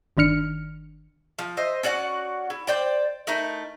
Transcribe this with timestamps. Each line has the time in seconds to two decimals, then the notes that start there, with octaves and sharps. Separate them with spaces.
0.17 G1 D#3 D4 F6 C#7
1.39 F3
1.57 C5 D#5 E5
1.83 C#4 F#4 D5 F#5
2.50 E4
2.67 C5 D5 G5
3.27 A3 D#4 E4 A#4